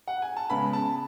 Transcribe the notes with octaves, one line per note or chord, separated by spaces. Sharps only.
F#5
G#5
A5
C#3 G#3 B3 B5
A5